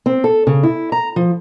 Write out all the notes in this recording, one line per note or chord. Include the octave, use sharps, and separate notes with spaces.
C4
A4
C#3
E4
A#5
F3